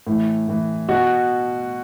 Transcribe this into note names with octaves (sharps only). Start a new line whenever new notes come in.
A2 E3
A2 E3
B2 F#4